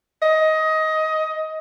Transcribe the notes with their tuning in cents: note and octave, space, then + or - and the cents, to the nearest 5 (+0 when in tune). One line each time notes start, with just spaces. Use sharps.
D#5 +20